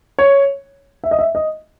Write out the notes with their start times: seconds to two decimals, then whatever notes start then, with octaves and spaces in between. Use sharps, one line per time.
0.19 C#5
1.04 E5
1.11 D#5
1.19 E5
1.35 D#5